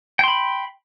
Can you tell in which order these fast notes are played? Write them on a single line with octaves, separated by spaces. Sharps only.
G5 C6 B5